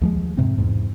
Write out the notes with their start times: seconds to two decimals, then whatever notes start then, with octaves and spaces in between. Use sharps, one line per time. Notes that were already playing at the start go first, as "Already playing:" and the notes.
0.01 D#2 F3 G#3
0.37 G#2 C3 C4
0.58 E2 G#2